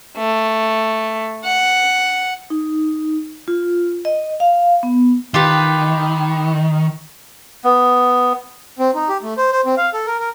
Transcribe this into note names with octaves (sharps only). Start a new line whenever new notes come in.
A3
F#5
D#4
F4
D#5
F5
B3
D#3 F4 G4 B4
B3
C4
D#4
G4
A3
C5
C5
C4
F5
A4
A#4
A#4